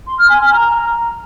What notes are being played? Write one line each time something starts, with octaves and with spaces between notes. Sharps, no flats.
C6
F6
G#5
F6
A#5